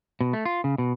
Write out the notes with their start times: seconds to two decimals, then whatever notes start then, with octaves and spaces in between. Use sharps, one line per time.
0.21 B2
0.33 A3
0.45 F4
0.64 C#3
0.78 B2